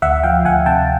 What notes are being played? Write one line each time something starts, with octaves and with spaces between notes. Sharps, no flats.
D2 E5 F#5
F3 F5 G5
D2 F#5 G#5
C3 G5 A5